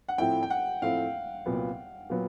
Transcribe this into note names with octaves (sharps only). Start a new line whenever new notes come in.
F#5
A2 F3 A3 C4 E4 G5
G5
F#5
A2 F3 A3 C4 E4 F5
C2 A#2 F#3 B3
A#2 F#3 B3